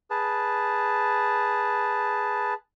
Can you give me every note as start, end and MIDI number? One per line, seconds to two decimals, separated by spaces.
0.11 2.54 68
0.11 2.54 71
0.11 2.54 81